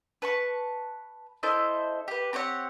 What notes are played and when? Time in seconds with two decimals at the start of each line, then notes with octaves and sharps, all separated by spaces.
0.22 B4 A5 C#6
1.43 E4 A4 C5 D#5
2.08 G4 B4
2.33 C4 G4 C#5 F#5